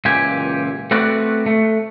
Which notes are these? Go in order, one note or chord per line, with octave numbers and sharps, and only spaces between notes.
C#2 A#2 E3 G4 G#5
A3 C4 F#4 B4 D5
A3